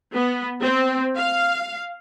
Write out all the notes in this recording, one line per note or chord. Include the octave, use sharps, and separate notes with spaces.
B3
C4
F5